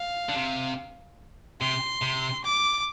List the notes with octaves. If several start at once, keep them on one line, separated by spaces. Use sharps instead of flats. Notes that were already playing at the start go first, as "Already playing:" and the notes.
Already playing: F5
D3
C3
C3 C6
C3
D6